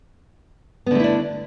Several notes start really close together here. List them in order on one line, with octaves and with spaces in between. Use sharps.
B3 D3 A3 E4 D4